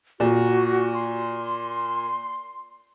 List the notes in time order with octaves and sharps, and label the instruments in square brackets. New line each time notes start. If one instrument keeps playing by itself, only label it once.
[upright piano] A#2 [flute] F#4
[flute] C6